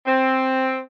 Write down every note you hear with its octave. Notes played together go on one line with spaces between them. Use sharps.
C4